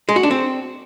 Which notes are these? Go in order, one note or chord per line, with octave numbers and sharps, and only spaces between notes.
G#3
F#4
D4
C4